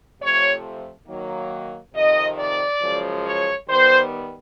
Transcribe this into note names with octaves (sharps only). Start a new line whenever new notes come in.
F2 C3 F3 A3 C#5
D#3 F#3 A#3
F2 C3 D#3 D#5
D5
F#2 C#3 F3 G#3
C#5
D#3 G3 B3 C5